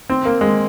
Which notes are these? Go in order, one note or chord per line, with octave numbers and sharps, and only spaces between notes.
C4
A#3
G#3